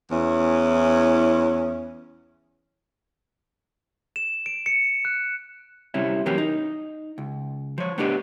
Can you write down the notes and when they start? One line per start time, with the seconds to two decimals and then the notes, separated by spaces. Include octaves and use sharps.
0.10 E2 C#4 E4
4.16 E7
4.46 D7
4.66 C#7
5.05 F#6
5.94 C3 G3 C#4 E4
6.26 E3 F#3 A#3 C#4 G4
6.38 D#4
7.18 C#2
7.78 F3 C#5
7.98 A3 B3 D4 G4 D#5